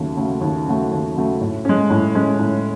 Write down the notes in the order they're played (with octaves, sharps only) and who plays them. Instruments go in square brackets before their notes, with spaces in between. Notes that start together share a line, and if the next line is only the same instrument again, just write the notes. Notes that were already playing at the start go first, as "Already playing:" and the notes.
Already playing: [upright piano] D#2 C#3 F#3 A3
C#3 F#3 A3
D#2
C#3 F#3 A3
D#2
C#3 F#3 A3
A2
G#3 C#4
A2
G#3 C#4
A2